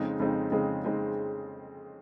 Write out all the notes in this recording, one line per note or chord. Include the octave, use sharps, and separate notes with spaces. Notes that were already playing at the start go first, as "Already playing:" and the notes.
Already playing: F2 C#3 G#3 C4 D#4
F2 C#3 G#3 C4 D#4
F2 C#3 G#3 C4 D#4
C#3 G#3 C4 D#4